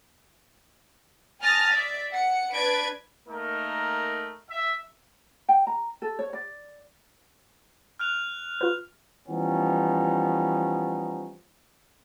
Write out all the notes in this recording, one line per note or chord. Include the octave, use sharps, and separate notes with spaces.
G#5 A5 D#6 F6 A6 A#6
D5 E5
F#5 C#7
D4 B4 D5 G#6 D7
A3 A#3 D#4 A#4
E5
G5
A#5
A4
C#5
D5
F6 F#6 F7
F4 B4
E3 F3 G3 B3 C#4 D#4